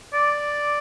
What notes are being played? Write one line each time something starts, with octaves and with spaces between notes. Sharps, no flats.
D5